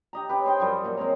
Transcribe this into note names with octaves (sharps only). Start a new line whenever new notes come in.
G4 D#5 A#5
C#4 G4 B4
G#4 C5 D#5 G5
F#2 F3 G3
A#2 F#3
G#3 C4 C#4 A#5